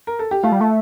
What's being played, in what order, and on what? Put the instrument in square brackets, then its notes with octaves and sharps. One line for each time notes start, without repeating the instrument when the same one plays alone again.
[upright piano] A#4
A4
G4
[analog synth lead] A3 [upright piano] F4
[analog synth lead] G3
A3